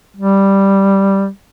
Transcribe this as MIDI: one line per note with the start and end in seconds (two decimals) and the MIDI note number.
0.17 1.29 55